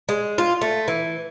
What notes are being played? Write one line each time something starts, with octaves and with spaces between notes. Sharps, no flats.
G#3
F4
A3
E3